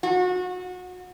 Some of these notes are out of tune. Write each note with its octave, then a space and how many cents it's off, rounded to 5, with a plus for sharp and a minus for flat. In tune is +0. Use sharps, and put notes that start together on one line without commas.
F#4 -25